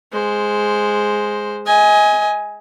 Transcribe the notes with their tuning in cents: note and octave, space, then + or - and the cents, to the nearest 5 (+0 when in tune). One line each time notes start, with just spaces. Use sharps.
G#3 +0 C5 +0
D#5 +30 G#5 +0